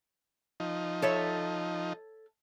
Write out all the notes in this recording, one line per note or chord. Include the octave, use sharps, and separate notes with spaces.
F3 D#4
A4 C#5 E5